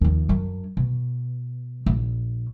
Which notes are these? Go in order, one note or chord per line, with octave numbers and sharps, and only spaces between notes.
D#2 F3
F#2 D4
B2
A#1